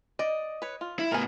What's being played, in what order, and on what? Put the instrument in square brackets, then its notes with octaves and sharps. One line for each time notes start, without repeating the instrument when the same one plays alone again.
[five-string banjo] D5 [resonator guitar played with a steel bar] D#5
[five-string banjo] B4 C#5
F4
[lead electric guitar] E4
[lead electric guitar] A2 B3 [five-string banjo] A#4 G#5